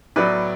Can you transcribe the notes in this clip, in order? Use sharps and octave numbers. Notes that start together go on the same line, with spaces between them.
A2 F#3 B3 B4 D5